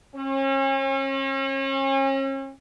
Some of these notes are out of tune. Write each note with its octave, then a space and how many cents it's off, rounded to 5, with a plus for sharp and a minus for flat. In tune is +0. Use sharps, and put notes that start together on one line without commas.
C#4 -40